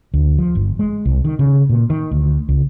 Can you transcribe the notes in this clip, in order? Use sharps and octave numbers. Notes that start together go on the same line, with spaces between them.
D2
F3
G1
G#3
C2
D#3
C#3
A#2
D#3
D2
C#2